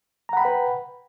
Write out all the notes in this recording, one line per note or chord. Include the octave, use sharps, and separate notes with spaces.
B4 F#5 G5 A#5 B5